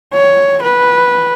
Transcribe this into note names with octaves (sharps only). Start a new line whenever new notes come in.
C#5
B4